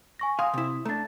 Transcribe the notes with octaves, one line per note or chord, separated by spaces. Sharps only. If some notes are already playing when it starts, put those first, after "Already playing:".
G#5 C#6 A#6
F5 G#5 C6 D#6
C3 E4
A3 D4 A#5 A6